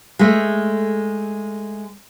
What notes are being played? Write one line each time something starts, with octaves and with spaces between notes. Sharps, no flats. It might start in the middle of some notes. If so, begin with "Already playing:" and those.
G#3 A3